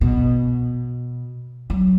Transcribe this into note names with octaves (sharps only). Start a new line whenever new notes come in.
B2
F#3